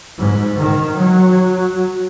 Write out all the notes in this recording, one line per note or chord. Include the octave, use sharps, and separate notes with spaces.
G#2
D#3
F#3